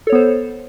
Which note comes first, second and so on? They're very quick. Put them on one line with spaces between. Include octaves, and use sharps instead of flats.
A4 C#5 B3 C5